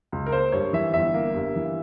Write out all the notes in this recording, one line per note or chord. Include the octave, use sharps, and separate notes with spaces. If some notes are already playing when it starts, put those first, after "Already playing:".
C#2
A#4
A#3 C5
G2 C#5
E3 E5
G1 E5
A#3
G2
E3